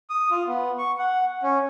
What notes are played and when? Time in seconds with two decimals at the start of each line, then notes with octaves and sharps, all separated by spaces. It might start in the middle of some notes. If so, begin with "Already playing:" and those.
0.10 D#6
0.31 F4
0.47 B3
0.78 C#6
0.98 F#5
1.43 C#4